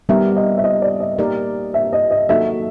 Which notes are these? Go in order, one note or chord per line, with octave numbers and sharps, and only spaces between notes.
G3 B3 D#4 G4 A#4 E5
D#5
E5
D#5
D5
D#5
A#3 D#4 G4 A#4 D5
E5
D#5
D#5
F#3 A#3 D#4 F#4 A4 E5